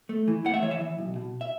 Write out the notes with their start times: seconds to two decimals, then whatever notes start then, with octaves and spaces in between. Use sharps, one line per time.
0.09 A3
0.28 E3
0.45 A3 F#5
0.54 E5
0.62 E3 C#5
0.71 E5
0.81 E3
0.98 B1
1.16 B2
1.41 E5